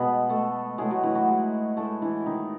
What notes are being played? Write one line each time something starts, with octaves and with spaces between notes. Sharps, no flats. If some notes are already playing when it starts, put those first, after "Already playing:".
Already playing: B2 G#3 B3 G#4 B4
A3 A4
A2 F#3 G#3 A3 G#4
F#3 F#4
E3 E4
F#3 F#4
G#3 G#4
A2 G#3 A3 A4
E3 E4
D#3 D#4